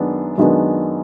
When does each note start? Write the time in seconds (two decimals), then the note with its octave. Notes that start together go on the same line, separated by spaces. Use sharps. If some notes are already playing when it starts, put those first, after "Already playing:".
Already playing: F#2 D#3 G#3 B3 D4
0.38 F#2 D#3 G#3 B3 D4